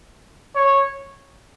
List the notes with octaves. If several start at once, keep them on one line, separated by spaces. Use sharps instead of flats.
C#5